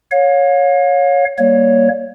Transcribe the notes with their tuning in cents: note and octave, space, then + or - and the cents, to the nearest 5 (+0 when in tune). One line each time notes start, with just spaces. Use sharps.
C#5 +0 F5 +35
G3 +0 A#3 +15 C#5 +0